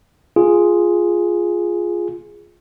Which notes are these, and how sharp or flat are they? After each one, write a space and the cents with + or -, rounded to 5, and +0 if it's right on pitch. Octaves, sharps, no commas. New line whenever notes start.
F4 +0 G#4 +0